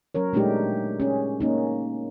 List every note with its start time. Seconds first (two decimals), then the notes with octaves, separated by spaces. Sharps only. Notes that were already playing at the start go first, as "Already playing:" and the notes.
0.15 F#3 C#4 A#4 C#5
0.33 A#2 G#3 A3 D4 D#4 G4
1.00 C#4 G#4
1.40 A#3 C#4 D#4